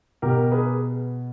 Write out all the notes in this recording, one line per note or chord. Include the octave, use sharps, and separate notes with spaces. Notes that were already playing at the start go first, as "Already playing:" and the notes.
B2 G4 A#4
G#4 B4